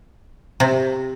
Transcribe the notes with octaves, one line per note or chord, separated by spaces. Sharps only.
C3